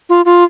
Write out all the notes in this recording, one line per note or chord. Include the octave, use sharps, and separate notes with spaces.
F4
F4